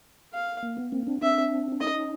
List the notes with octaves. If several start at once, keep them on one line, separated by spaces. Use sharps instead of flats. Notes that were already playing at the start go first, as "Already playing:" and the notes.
F5
A#3
B3
A#3 C4
C4 D4
C4 D4 E5
D4
C#4 D#4 D#5